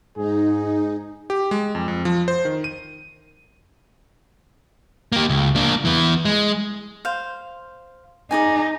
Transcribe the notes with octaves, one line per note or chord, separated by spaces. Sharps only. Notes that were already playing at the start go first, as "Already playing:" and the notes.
G#2 D#4 G#4
G4
G#3
F2
F2
F3
C5
D#3
D#7
A#3 G4
C#2
A#3 D4
E3 B3
G#3
C5 F5
D#4 G#4 D5 G#5